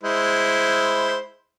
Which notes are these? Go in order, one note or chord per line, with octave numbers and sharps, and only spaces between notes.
G#3 E4 C5